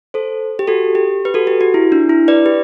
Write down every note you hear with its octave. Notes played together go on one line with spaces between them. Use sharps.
A4 C5
G4
F#4 A4
G4
B4
F#4 A4
G4
F#4
E4
D4
E4
B4 D5
G4 B4